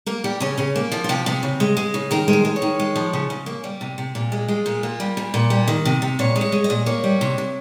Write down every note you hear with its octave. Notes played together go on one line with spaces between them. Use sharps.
A#3 A#4
G3 G4
C#3 C#4
C#3 C#4
A#3
F3 F4
F4
C3 G4
C3 G#4
C#3
G#3
G#3
C#3
D#3 A#4
G#3
C5
G#3
C#5
D#3
G#3
F3
C#3
C#3
A#3
G3
C3
C3
A#2
G#3
G#3 F4
A#2 F4
A#3
G3
A#2
A#2
G3
D#3
C3
C3
A#2 C#5
G#3
C#5
G#3
D#5
A#2
A#3 C#5
G3
C3
C3